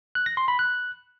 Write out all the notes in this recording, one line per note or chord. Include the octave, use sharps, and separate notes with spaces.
F#6
A#6
C6
B5
F#6